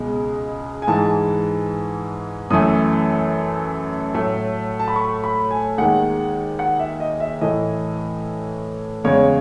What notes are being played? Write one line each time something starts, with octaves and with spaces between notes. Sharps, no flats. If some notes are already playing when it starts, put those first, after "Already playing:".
Already playing: C#2 B2 G#3
G#5
G#2 E3 G#3 A5
F#2 E3 A3 D#6
A2 F#3 A3
A5
B5
C#6
B5
G#5
D#2 D#3 G#3 F#5
F#5
E5
D#5
E5
A2 E3 A3 D#5
E2 C#3 G#3 C#5